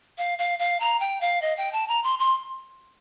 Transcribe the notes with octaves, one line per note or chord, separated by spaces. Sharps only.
F5
F5
F5
A#5
G5
F5
D#5
G5
A5
A#5
C6
C6